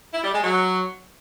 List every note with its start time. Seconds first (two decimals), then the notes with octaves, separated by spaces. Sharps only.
0.13 E4
0.24 G3
0.34 G#3
0.44 F#3